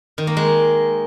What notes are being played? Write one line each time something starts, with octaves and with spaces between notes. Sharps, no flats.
D#3
A#3
G#3